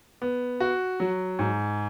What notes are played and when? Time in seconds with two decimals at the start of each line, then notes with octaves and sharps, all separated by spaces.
0.22 B3
0.60 F#4
1.00 F#3
1.39 G#2